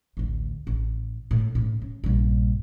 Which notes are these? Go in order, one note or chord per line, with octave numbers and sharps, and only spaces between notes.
A1 D2
A1
A2
A2 C#3
C#3
A#1 G2